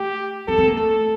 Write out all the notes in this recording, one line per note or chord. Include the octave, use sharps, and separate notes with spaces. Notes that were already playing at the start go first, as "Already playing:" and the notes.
Already playing: A3 G4
C4 A4
C4
A#3
A3 A4